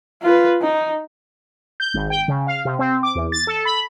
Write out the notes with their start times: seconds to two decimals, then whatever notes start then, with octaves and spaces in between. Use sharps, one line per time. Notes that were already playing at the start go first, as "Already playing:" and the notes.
0.22 F4 B4
0.62 D#4
1.80 G6
1.94 G#1
2.10 G5
2.28 C#3
2.47 F5
2.65 C3
2.79 C4
3.03 D6
3.15 E2
3.32 A6
3.47 A4
3.65 B5